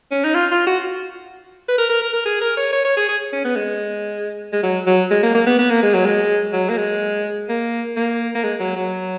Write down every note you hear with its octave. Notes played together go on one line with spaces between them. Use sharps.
C#4
D#4
F4
F4
F#4
B4
A#4
A#4
A#4
A#4
G#4
A#4
C#5
C#5
C#5
G#4
G#4
C#4
B3
G#3
G#3
F#3
F#3
G#3
A#3
A#3
B3
B3
A#3
G#3
F#3
G#3
F#3
A#3
G#3
A#3
A#3
A#3
G#3
F#3
F#3